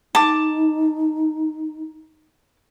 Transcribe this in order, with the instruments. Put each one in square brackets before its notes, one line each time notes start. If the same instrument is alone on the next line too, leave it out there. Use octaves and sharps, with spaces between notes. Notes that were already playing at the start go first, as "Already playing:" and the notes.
[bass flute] D#4 [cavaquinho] A5 D6